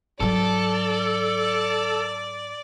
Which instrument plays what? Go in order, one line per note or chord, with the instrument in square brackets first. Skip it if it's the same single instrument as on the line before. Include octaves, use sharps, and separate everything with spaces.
[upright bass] G#2 F#3 [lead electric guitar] A4 [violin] D5